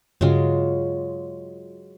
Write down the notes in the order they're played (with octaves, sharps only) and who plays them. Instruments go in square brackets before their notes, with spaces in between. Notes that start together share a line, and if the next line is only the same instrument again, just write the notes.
[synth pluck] G2 C#3 [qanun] F#3 G#3 F4